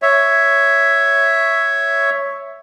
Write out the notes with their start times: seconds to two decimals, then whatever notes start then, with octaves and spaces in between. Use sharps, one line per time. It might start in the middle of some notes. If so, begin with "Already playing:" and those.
0.02 C#5 E5